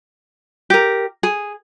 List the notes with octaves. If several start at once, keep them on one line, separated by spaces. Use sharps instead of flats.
G4 A#4
G#4